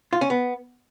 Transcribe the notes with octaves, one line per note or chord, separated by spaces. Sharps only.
F4
C#4
B3